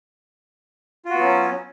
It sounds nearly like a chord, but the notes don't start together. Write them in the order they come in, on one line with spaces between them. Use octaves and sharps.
F4 F#4 B3 F#3 C#4